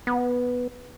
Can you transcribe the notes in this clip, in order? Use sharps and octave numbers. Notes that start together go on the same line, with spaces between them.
B3